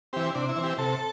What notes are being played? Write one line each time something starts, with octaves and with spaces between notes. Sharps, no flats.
E3 C4 G4
C3 D4
E4
E3 C4
G4
C3 A4